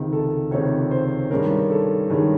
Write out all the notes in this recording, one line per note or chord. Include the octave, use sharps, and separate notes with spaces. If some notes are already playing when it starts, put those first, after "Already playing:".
Already playing: C#2 C3 D#3
A4
C#2 C3 D#3 C#5
C5
G2 D#3 G#3 C#4 A#4
A4
G2 D#3 G#3 C#4